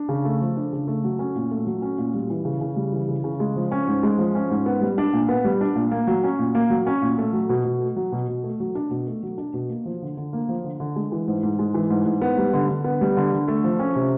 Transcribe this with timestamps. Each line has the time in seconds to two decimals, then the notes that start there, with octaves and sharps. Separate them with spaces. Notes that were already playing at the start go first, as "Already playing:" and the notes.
Already playing: D4
0.09 C#3
0.25 A3
0.41 F3
0.57 D4
0.73 C#3
0.87 A3
1.04 F#3
1.19 C#4
1.36 A#2
1.51 A3
1.67 F#3
1.82 C#4
1.98 A#2
2.14 G3
2.30 E3
2.45 C#3
2.61 C#3
2.76 G3
2.93 E3
3.08 C#3
3.24 C#3
3.40 G#3
3.56 F3
3.72 C#4
3.87 G#2
4.03 G#3
4.18 F3
4.35 C#4
4.50 G#2
4.66 B3
4.81 G3
4.98 D4
5.13 A#2
5.28 B3
5.45 G3
5.61 D4
5.76 A#2
5.91 A#3
6.07 F#3
6.24 C#4
6.39 A#2
6.55 A#3
6.70 F#3
6.87 C#4
7.02 A#2
7.18 A3
7.33 F#3
7.49 B2
7.65 B2
7.80 A3
7.96 F#3
8.12 B2
8.28 B2
8.43 A3
8.60 F#3
8.75 D4
8.91 B2
9.07 A3
9.23 F#3
9.38 D4
9.54 B2
9.69 A#3
9.85 F3
10.02 D3
10.17 D3
10.33 A#3
10.49 F3
10.64 D3
10.80 D3
10.96 G#3
11.12 E3
11.28 G#2
11.43 G#2
11.59 G#3
11.74 E3
11.90 G#2
12.06 G#2
12.21 B3
12.37 G3
12.53 D3
12.69 D3
12.84 B3
13.01 G3
13.17 D3
13.32 D3
13.48 A3
13.64 F3
13.79 C#4
13.96 C3